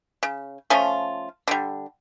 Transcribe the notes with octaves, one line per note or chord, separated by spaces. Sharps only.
C#3
F3 A3 C#4 F4
D3 G3